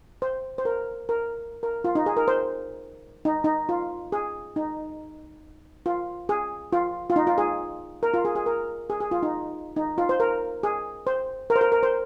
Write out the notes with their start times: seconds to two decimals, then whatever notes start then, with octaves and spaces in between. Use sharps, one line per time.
0.22 C5
0.58 C5
0.65 A#4
1.09 A#4
1.63 A#4
1.84 F4
1.95 D#4
2.06 G#4
2.17 A#4
2.28 C5
3.25 D#4
3.44 D#4
3.69 F4
4.12 G#4
4.56 D#4
5.86 F4
6.29 G#4
6.73 F4
7.10 F4
7.16 D#4
7.27 F4
7.38 G#4
8.03 A#4
8.14 F4
8.25 G#4
8.35 G#4
8.46 A#4
8.90 G#4
9.00 G#4
9.11 F4
9.23 D#4
9.76 D#4
9.98 F4
10.09 C5
10.20 A#4
10.63 G#4
11.07 C5
11.50 A#4
11.56 C5
11.61 A#4
11.72 A#4
11.83 C5